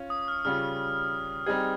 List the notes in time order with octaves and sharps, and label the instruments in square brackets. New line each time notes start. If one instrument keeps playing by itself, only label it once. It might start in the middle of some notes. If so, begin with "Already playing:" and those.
Already playing: [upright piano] C#4 F4
[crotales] D#6
F6
[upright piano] C#3 G3 C#4 F4 [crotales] F6
[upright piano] G3 C4 D#4 G#4 [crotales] G#6